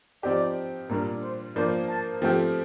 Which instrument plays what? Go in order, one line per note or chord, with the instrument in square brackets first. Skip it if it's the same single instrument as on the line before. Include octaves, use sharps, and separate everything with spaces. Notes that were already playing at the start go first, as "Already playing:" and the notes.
[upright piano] F3 C4 D#4 G4 [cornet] D5
[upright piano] A#2 G3 D4 [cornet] A#4
[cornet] C5
[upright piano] F3 A#3 D4 F4 C5 [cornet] D5
[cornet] A5
[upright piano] F3 A3 C4 G4 [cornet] G5